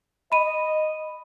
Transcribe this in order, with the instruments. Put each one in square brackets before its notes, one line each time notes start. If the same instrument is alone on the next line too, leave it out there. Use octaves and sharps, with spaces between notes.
[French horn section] D#5 [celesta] B5 D#7